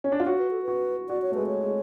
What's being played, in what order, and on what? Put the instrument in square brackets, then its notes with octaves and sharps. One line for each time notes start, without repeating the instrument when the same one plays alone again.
[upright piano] C#4
D4
F4
[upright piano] F#4 [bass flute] C#5
[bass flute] B4
A4
[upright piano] F#4 [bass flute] B4
[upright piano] F#4 [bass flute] D5
[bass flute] C#5
[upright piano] G#3 A3 [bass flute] B4
[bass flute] C#5
[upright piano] G#3